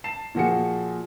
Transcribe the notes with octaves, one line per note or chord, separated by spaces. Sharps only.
A5 C7 E7
A#2 F3 F#4 G#4 C#7